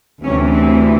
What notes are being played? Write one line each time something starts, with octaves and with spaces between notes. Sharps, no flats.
D2 C3 E3 C#4
C4